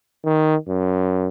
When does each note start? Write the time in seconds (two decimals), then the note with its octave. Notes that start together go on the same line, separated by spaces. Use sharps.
0.25 D#3
0.68 F#2